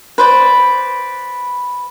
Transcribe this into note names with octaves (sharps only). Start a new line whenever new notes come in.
B4 C5 D5